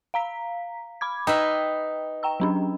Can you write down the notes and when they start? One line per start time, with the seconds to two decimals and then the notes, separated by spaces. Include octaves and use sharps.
0.14 F5 A#5 B6
1.01 B5 D6 G#6
1.27 D#4 B4 E5 G5
2.23 G5 A#5 E6
2.40 F#3 C#4 D4